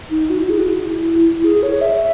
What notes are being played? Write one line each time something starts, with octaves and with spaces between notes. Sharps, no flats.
D#4
F#4
E4
G#4
F#4
E4
G#4
C#5
E5